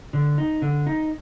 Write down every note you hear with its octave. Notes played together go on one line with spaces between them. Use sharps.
D3
D#4
D3
D#4